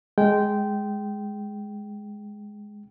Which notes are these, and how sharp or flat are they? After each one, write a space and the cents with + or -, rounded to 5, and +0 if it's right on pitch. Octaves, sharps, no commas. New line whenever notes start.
G#3 +0 G5 -15